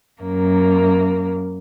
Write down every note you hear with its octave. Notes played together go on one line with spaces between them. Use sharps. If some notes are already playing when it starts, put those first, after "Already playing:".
F#2 A#3